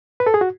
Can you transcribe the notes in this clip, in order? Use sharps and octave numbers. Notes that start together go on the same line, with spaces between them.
B4
A4
G#4
F#4